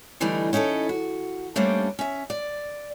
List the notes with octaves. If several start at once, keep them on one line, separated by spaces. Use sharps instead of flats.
D3 E3 G3 A3 D4 D#4
C#4 D#4 E4 G4 A4
F#4
G3 A3 A#3 C#4 D4 C5
C#4 E5
D5